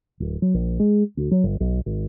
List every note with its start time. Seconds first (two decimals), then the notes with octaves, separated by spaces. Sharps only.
0.20 D1
0.42 F#3
0.54 A#1
0.80 G#3
1.17 D2
1.31 F#3
1.44 G1
1.60 B1
1.86 G#1